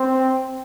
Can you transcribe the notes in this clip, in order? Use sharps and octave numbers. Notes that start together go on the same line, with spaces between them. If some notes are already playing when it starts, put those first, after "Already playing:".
Already playing: C4